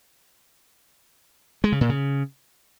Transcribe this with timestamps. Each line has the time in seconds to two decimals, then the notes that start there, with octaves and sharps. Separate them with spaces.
1.64 G#3
1.72 C#3
1.81 A#2
1.89 C#3